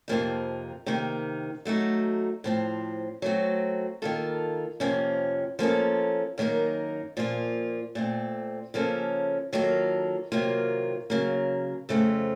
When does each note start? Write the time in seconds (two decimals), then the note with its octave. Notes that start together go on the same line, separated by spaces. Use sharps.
0.08 F2 C3 F3 A#3 D#4
0.86 C3 D#3 A#3 D#4
1.65 F#3 A3 D#4 F#4
2.44 A2 F3 C4
3.22 F#3 A3 C4 F#4
4.02 D#3 A#3 F4 A4
4.80 F2 C3 F3 A#3 C#4
5.59 F3 A#3 C#4 A4
6.38 F#2 D#3 A#3 D#4 A#4
7.17 A#2 F3 A#3 F4
7.95 A#2 A3 C4
8.74 C#3 F3 A#3 C#4 A4
9.53 D#3 F#3 A#3 F4 A4
10.32 C3 D#3 F#3 A#3 F4
11.10 C#3 F#3 A#3
11.89 F2 C#3 A3 C4 F4